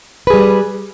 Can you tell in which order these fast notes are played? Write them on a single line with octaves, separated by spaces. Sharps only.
B4 G#4 G3